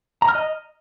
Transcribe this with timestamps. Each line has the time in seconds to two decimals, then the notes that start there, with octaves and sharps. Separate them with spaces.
0.22 A#5
0.29 F6
0.35 D#5